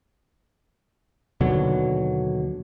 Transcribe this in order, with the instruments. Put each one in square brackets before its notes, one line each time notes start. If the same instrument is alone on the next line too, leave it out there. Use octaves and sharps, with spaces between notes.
[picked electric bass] D#2 B2 D3 F#3